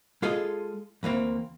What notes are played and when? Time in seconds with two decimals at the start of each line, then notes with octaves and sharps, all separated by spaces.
0.22 G#3 F4 G#4 A4 D#5
1.03 D2 E3 A#3 C4